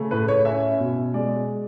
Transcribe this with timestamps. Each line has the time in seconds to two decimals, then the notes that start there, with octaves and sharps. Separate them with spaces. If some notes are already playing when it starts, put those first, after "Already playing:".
Already playing: C#3 A3
0.11 A2 B4
0.28 C#5
0.45 C#4 E5
0.80 B2
1.14 G#3 D5